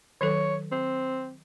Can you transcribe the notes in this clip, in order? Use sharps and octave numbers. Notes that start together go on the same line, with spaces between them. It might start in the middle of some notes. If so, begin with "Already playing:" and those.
D#3 F#3 A4 C#5
C4